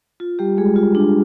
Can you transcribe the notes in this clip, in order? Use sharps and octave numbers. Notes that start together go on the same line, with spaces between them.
F4
G3 G4
G#3 G#4
F4
D4